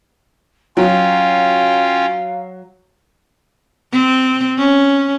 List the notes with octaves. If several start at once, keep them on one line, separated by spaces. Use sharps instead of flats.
F#3 C#4 F4 F5 G5
C4
C#4